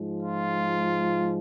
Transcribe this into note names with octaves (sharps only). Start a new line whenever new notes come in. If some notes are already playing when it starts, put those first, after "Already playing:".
Already playing: G#2 F3 G#3
F4